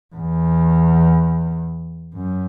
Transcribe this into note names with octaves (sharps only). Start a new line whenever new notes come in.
E2
F#2